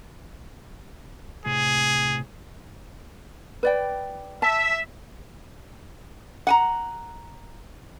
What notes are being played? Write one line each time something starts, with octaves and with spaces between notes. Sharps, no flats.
A2 C3 G#4
B4 D5 G5
E5 A5
F#5 G#5 A#5